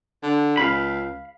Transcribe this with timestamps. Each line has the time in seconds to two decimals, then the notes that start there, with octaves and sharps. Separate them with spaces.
0.23 D3
0.57 C#2 F5 B5